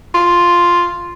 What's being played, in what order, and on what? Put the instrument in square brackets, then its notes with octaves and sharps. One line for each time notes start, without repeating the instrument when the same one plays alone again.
[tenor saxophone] F4